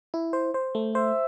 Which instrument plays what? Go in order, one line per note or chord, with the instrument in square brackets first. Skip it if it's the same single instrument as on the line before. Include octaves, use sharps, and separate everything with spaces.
[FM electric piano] E4
C5
C5
A3
[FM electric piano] C5 [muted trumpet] E5